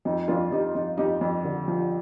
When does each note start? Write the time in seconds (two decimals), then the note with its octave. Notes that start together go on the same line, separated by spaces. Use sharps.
0.05 F2 D#4
0.28 F2 D4 F4
0.52 F2 D#4 G4
0.75 F2 D#4
0.98 F2 D#4 G4
1.21 F2
1.44 D3
1.68 F3